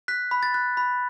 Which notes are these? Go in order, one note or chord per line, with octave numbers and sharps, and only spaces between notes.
F#6 B6
B5
A6
F#6
B5